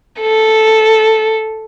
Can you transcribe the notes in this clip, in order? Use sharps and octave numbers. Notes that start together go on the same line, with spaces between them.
A4